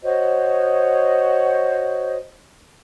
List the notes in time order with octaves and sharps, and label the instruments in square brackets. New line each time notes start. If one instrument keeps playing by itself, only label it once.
[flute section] F#4 C5 C#5 D#5